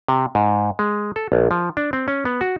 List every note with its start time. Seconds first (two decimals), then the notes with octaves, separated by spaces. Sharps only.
0.08 C3
0.35 G#2
0.79 G#3
1.16 A4
1.32 A#1
1.51 F3
1.77 D4
1.93 C4
2.08 C#4
2.25 B3
2.41 F#4